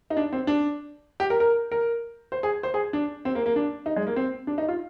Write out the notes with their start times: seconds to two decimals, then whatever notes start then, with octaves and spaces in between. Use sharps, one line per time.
0.10 D#4
0.17 D4
0.33 C4
0.47 D4
1.20 G4
1.30 A#4
1.40 A#4
1.72 A#4
2.32 C5
2.43 G#4
2.63 C5
2.74 G#4
2.93 D4
3.25 C4
3.35 A#3
3.46 A#3
3.56 D4
3.86 D#4
3.96 G#3
4.07 A#3
4.16 C4
4.47 D4
4.58 D#4
4.68 F4